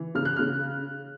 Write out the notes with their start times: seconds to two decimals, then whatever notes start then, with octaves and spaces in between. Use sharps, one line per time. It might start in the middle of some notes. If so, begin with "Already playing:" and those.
Already playing: E3
0.15 C#3 F6
0.25 F#6
0.36 C#3 F6